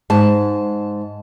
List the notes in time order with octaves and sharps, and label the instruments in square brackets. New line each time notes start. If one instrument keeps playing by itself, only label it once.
[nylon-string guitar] G#2 A5